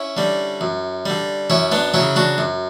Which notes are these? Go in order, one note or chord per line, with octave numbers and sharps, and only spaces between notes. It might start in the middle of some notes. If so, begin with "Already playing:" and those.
Already playing: C#4 E4
D3 G3
F#2
D3 G3
F#2 C#4 E4
B3 D4
C#3 F#3 C#4 E4
D4 F#4
F#2